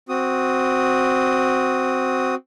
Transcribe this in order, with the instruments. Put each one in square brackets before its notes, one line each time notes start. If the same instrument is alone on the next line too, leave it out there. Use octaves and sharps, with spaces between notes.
[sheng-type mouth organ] C4 F#4 D#6